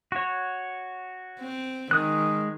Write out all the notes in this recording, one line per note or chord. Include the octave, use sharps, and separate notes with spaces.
F#4 C#5
C4
D#3 G#3 D#6 F#6